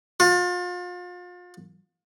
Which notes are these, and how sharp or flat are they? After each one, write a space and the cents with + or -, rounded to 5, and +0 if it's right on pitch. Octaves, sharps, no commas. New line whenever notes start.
F4 +35